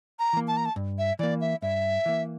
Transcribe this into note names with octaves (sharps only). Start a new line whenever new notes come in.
A#5
E3 A#3
A5
A#5
A5
G2
E5
E3 A#3 D5
E5
G2 E5
E3 A#3